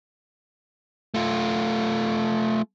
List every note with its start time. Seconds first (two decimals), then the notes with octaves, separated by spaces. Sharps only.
1.14 A3 F4